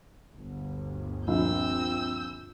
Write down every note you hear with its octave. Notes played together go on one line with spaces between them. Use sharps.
G1 D2
A#1 C4 E6 G6